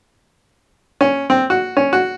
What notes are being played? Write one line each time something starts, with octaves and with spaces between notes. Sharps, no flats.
C#4
C4
F#4
C#4
F#4